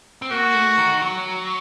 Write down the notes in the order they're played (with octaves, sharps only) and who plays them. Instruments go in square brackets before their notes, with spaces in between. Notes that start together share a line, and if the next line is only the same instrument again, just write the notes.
[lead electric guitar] C4
[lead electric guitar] A#3 [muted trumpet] F#4
[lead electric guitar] A3
D#3
F#3